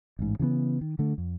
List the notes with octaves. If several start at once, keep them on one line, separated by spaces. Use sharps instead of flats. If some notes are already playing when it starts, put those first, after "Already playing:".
A1 G#2
C#3 E3 F#3 B3
D#3
D3 A3
F2